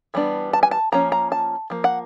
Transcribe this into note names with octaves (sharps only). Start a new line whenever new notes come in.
E3 G3 B3 D4
A5
G#5
A5
F3 A#3 C#4 A#5
A#5
A5
F3 A#3
F#5